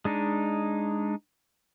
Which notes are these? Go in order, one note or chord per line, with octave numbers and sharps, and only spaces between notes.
G#3 D4 D#4